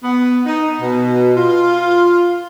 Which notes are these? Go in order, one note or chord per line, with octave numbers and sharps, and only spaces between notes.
B3
D#4
B2
F4